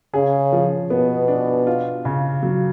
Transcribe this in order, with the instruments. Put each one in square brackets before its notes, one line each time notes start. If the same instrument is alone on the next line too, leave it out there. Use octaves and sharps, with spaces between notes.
[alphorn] C#3 [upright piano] G#4
[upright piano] F3
[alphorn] B2 [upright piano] B3
[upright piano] D4
F4
C#3
F#3